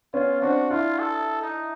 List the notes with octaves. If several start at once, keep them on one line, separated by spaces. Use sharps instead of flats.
B3 C#4 F4
C4 D4 F#4
D4 E4 F4
A4
D#4